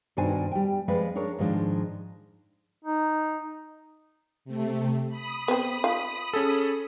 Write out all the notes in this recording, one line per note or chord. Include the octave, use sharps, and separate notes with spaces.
G2 B2 D#3 D4 C5 G#5
G3 G5
F3 G#3 C4 B4 D5 F5
D4 G#4 A#4 C#5
G#2 D#3 F3 G#3 D4
D#4
C3 A3
B5 D#6
B3 C4
F4
C#4 G#4 A4